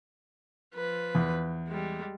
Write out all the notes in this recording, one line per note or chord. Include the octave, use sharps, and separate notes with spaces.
F3 B4
E2
G3 G#3